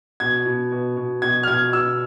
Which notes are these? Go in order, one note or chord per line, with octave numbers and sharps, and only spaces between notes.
B2 G#6
B2
B2
B2
B2 G#6
F6
B2 G#6
B2 E6